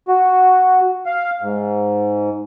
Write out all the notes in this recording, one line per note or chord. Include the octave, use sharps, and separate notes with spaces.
F#4
F5
G#2